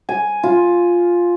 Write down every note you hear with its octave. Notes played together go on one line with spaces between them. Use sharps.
G#5
F4